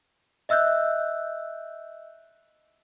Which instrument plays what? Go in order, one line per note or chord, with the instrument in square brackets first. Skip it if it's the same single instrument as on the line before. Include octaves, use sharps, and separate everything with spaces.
[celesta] D#5 E5 E6 F#6 G6